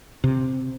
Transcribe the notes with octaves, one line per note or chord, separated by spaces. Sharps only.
C3